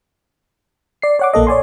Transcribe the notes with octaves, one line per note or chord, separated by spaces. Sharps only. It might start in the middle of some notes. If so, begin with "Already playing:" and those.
D5 C7
C#5 F#5 D6
A#1 A#3 A4 D#5
C#5 D5 G#5 C6